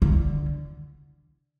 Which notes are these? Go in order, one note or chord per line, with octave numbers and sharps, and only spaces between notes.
D3